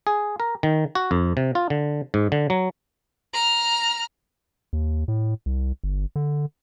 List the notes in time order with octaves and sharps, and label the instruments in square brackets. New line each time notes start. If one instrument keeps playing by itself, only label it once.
[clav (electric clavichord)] G#4
A#4
D#3
F#4
F2
C3
F4
D3
G#2
D3
F#3
[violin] A#5 F6
[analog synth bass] D#2
A2
C2
G1
D3